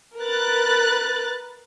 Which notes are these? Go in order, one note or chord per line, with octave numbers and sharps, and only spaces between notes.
A#4 B4 F#6 A6